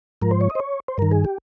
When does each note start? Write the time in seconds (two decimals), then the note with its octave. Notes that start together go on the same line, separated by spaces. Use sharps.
0.22 G#2 F3 A#4
0.31 C5
0.41 C#5
0.50 D#5
0.55 C5
0.60 C#5
0.88 C5
0.98 G2 D#3 A#4
1.11 G#4
1.25 G4